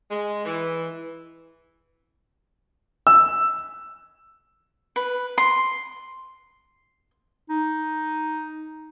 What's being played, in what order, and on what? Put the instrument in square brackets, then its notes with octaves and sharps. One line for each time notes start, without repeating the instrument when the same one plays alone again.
[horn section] G#3
E3
[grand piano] E6
[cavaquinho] B4
C6
[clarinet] D#4